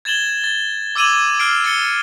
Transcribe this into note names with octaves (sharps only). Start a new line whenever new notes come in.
G#6 A6 E7 F#7 G7
A6
D6 E6 G#6 D#7 E7 F#7
F6 C7 D7
A6 C#7 G7